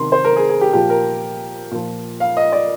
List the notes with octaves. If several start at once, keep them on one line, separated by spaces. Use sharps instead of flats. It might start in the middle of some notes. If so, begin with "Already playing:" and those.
Already playing: C3 D#3 C6
C5
A#4
G#4
G#4
G4
A#2 F3 G4
A#4
A#2 F3
F5
D#5
D5